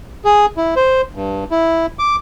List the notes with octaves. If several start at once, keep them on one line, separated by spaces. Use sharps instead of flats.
G#4
E4
C5
G2
E4
D6